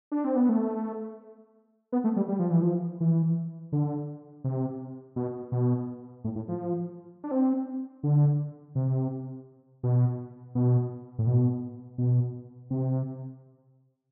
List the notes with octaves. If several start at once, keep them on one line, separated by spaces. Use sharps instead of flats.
D4
C4
B3
A3
B3
A3
G3
G3
F3
E3
F3
E3
D3
C3
B2
B2
A2
A2
F3
D4
C4
D3
C3
B2
B2
A2
B2
B2
C3